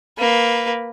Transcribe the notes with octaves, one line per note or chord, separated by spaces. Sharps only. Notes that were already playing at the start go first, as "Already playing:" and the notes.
A#3 B4